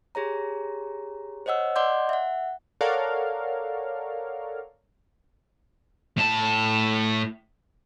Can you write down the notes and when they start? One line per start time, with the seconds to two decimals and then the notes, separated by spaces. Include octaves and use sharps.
0.15 G4 G#4 C#5 A#5
1.46 C5 C#5 D#5 F#5 E6
1.76 D5 D#5 F#5 C6 D6 G6
2.09 E5 F#5
2.81 A4 A#4 C#5 D5 F5 F#5
6.17 A2 A5